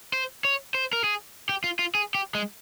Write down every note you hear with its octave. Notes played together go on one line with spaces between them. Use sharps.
C5
C#5
C5
A#4
G#4
G4
F4
F4
G#4
G4
G#3